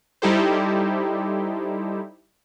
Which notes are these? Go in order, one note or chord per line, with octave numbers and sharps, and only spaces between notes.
G3 D#4 E4 G4 A4 C5